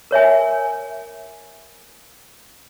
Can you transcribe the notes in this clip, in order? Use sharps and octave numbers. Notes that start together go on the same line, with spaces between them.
A#4 C#5 E5 G#5